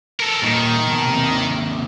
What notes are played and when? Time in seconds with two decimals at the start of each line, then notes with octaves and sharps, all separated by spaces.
0.20 A4 A#4
0.43 A#2 D#3 D#4
0.88 B2 A5
1.07 D#2 C3